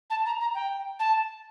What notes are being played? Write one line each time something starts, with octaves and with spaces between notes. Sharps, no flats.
A5
A#5
A#5
G5
A5